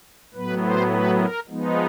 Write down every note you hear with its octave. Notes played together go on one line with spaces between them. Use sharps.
A2 F#3 B3 B4
C5
B4
A#4
F3 G#3 B3 D#4